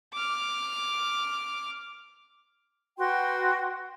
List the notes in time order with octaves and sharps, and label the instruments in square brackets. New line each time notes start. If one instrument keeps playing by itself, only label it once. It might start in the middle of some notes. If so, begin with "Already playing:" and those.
[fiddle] D6 F6
[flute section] F#4 B4 G5 C6